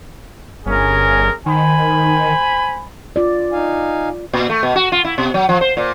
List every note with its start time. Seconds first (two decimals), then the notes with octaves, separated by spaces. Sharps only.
0.66 G1 C#4 G#4 A#4
1.46 D#3 C5 G#5 B5
3.16 F4 D5
3.52 D#4 F5 G#5
4.33 A#2
4.50 A3
4.63 B2
4.76 F#4
4.92 F4
5.04 E4
5.18 B2
5.34 F#3
5.49 F3
5.61 C5
5.77 A#2